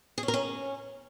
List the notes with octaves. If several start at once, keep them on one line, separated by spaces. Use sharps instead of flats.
G#4
C#4
A#4
C#4